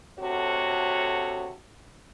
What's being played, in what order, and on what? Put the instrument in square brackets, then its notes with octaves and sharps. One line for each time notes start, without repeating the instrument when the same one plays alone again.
[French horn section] D2 C3 F#4 A4 C#5